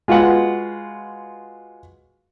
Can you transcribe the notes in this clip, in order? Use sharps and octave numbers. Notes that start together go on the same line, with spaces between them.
G#3 F4 F#4 B4 F#5